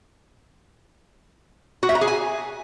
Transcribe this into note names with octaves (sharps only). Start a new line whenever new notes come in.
F#4
E5
A#5
G#4
G#5